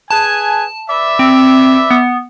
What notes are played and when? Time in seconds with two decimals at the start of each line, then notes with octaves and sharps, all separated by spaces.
0.11 G#4 B4 G#5 A5
0.89 B4 D5 E5
1.19 C4
1.91 B3